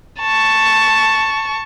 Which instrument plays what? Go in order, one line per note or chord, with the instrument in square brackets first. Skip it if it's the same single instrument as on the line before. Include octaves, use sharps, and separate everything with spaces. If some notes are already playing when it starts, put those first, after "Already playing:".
[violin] A5 C#6